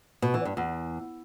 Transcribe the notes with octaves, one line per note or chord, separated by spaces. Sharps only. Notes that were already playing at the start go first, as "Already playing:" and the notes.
B2
E3
G2
E2